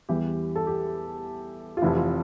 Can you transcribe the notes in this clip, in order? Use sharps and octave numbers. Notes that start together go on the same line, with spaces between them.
E2 E3 G3 G4
A4
G4
F4
F1 F2 E3 E4
F4